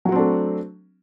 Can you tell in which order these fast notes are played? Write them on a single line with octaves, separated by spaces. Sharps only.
F#3 F#4 C4 D4 A3